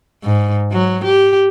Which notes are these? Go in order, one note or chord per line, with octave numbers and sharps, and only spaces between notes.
G#2
F#3
G4